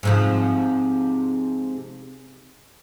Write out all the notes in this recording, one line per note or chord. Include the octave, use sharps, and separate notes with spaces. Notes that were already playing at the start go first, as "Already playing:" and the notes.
G#2 C3 F3